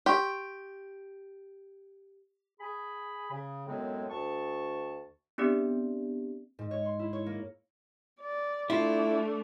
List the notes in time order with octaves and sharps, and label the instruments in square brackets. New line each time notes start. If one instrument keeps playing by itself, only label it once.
[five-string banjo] G4 [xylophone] C6 C#6
[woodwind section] G#4 B5
C#3
F#2 A2 F#3 G#3 B3 C4
D2 A5 C#6
[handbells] B3 C4 D4 G4 D5
[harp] G#2
C#5
C6
E4
C#5
A#3
[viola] D5
[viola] A3 D4 [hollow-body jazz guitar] E4 F4